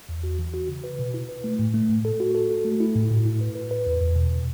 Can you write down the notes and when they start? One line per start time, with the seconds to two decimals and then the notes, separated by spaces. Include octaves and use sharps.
0.09 E2
0.23 F#4
0.39 E3
0.54 F#4
0.69 C#3
0.84 B4
0.99 B2
1.14 E4
1.29 B4
1.44 A3
1.59 A2
1.74 A3
1.89 A2
2.05 A4
2.20 F#4
2.35 A4
2.50 F#4
2.65 A3
2.80 E4
2.96 A2
3.11 A2
3.26 E4
3.41 B4
3.55 B4
3.71 B4
3.86 E2
4.01 E2
4.16 B2
4.32 B2